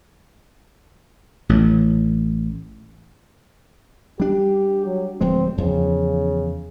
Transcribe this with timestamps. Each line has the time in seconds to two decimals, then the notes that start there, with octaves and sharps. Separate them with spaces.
1.49 A1 A2
4.20 G3 D4 G4
4.86 F#3
5.21 D1 F3 G#3 C4
5.58 E2 C#3 F3